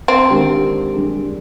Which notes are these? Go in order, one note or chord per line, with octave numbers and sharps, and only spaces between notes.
C4
D#3 G#3 D4 G4 A#4
G3 D4 G#4